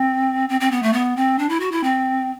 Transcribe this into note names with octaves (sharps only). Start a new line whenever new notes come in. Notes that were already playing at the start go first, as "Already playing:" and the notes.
Already playing: C4
C4
C4
B3
A3
B3
C4
D4
E4
F#4
E4
C4